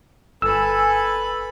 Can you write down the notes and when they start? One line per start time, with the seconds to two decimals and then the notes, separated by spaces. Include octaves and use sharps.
0.42 G1 A4 B4 G#5 B5 E6